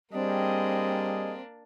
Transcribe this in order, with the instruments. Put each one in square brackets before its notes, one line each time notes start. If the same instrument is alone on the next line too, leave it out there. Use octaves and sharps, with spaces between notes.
[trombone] G3 [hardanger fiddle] A#3 D4 [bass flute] C4 [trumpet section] G#4 D#5